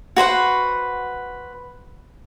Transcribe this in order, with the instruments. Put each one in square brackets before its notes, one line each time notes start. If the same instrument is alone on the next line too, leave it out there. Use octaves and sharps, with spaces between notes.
[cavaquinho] F#4 B4 C5 F#5